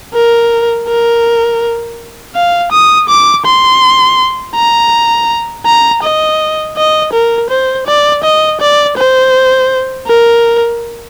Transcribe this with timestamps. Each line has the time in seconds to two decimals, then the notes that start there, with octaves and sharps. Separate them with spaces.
0.14 A#4
0.88 A#4
2.35 F5
2.72 D#6
3.09 D6
3.46 C6
4.56 A#5
5.66 A#5
6.03 D#5
6.77 D#5
7.13 A#4
7.50 C5
7.87 D5
8.24 D#5
8.61 D5
8.97 C5
10.08 A#4